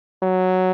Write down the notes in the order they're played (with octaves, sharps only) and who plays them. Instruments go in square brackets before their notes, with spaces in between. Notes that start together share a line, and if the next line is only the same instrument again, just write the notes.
[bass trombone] F#3